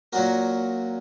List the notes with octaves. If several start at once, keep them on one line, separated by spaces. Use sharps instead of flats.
A#2 F#3 C#4 F#4 A#4